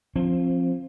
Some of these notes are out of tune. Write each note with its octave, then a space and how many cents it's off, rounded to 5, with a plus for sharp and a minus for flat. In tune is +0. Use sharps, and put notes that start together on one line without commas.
F3 +0 C4 +20